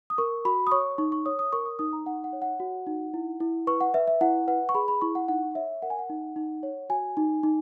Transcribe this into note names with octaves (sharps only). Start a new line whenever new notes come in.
D#6
A#4 C#6
F#4 B5
D#6
C#5 C#6
D#4 C#6
C#6
C#5 D#6
D#6
A#4 C#6
D#6
D#4 D#6
A#5
D#4 F#5
F#5
C#5
F#5
F#4
D#4
E4
E4
B4 C#6
F#5
B4 E5
E5
E4 F#5
B4 F#5
C#6
G#4 B5
B5
E4 C#6
F#5
D#4 F#5
F#5
C#5 E5
A#4 F#5
G#5
F#5
D#4
D#4
C#5
F#4 G#5
D#4
D#4